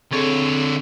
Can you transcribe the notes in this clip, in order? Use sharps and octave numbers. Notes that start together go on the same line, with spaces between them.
D3 C4 G#4 A4 C#5